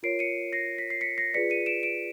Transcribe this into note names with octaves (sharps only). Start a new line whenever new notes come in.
F4 A#4 C#5 C7 D7
C#7 D#7
A#6 C7
B6
C7
B6 C#7
A#6 C7
F4 G#4 B4 D5 B6 C#7
C#7 D#7
D7 E7
D7 E7